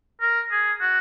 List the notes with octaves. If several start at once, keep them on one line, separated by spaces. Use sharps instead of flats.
A#4
G#4
F#4